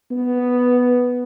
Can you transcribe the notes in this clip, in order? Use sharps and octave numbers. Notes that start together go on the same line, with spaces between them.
B3